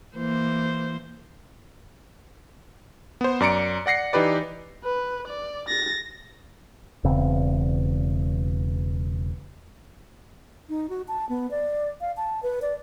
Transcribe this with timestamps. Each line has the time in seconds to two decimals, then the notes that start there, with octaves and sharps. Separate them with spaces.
0.16 E3 A#3 C5
3.21 B3 C5
3.40 F#2 D5 A#5 C#7 D7
3.86 D5 F#5 A#6 C7 C#7
4.13 E3 D#4 G4 B4 D5
4.84 B4
5.28 D5
5.68 A6 A#6
7.04 E1 E2 C#3 C4
10.69 D#4
10.89 F#4
11.08 A5
11.29 B3
11.51 D5
12.01 F5
12.17 A5
12.43 B4
12.62 D5